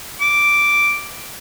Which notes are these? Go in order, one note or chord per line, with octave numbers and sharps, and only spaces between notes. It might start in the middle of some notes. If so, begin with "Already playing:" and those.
D6